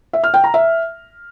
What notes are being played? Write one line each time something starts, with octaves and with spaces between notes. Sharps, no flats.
E5
F6
G5
A#5
E5